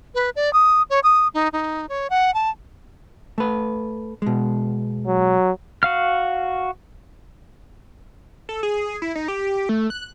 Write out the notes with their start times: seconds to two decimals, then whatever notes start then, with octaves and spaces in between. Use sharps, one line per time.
0.15 B4
0.36 D5
0.53 D#6
0.90 C#5
1.03 D#6
1.34 D#4
1.53 D#4
1.89 C#5
2.10 F#5
2.34 A5
3.38 A3 B4
4.22 B2 G#3
5.06 F#3
5.83 F#4 F5 F6
8.49 A4
8.63 G#4
9.02 E4
9.15 D#4
9.28 G4
9.69 A3
9.90 F#6